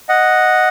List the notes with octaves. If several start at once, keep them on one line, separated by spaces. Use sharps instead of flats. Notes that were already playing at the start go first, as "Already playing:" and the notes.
D#5 F#5